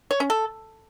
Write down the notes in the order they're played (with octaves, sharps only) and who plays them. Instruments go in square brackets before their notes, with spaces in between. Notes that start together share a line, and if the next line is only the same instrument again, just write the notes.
[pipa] C#5
C#4
A4